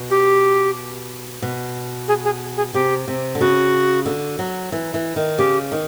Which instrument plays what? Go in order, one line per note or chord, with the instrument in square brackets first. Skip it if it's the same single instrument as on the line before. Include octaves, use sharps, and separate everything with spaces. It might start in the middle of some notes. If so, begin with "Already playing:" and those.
Already playing: [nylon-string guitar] B2
[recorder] G4
[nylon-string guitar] B2
[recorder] G#4
G#4
G#4
[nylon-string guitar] C3 [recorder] G4
[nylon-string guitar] C3
D3
[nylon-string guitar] C#3 [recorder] F#4
[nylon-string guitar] D3
F#3
E3
E3
D#3
[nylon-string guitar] C#3 [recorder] G4
[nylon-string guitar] D#3